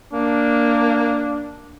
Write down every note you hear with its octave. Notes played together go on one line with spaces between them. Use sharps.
A#3 D4